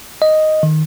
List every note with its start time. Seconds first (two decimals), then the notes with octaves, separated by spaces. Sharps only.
0.22 D#5
0.63 D#3